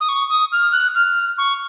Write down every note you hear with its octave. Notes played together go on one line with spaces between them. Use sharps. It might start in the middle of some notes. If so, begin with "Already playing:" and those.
D#6
C#6
D#6
F6
F#6
F6
C#6